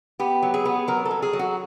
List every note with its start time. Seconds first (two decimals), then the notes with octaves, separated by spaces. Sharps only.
0.20 B3 G4
0.43 F#3
0.54 G#4
0.65 B3
0.88 F#3 A#4
1.06 A4
1.11 F#3
1.22 G#4
1.33 F#3
1.39 F#4